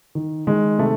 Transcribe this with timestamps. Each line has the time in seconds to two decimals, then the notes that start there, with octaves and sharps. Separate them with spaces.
0.15 D#3
0.47 D#3 G#3
0.79 C3 A3